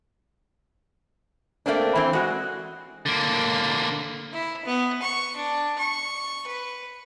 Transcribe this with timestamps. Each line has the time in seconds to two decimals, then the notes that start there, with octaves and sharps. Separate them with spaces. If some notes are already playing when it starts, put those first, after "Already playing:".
1.66 A3 A#3 C4 D4
1.95 E3 C4
2.13 G#3 F#4
3.06 D3 A#3
4.33 E4
4.65 B3
5.02 C#6
5.36 D4
5.78 C#6
6.47 B4